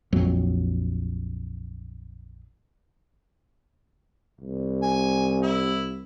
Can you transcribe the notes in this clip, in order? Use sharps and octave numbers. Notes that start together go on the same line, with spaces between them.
A#1 F2 F#3
C2
G#5
E4